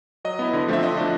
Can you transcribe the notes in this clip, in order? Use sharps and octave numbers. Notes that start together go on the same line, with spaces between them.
F#3 D#5
B3 E4
D3
F3 A3 C4 E5
D3 D#5
F3 A3 D4